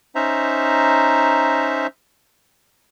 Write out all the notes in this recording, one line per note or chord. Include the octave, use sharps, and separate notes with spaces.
C#4 D#4 C5 E5 A#5